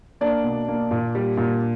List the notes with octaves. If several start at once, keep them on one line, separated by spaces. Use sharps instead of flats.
A#3 D4 D5
B2
A#3
A#2
G3
A#2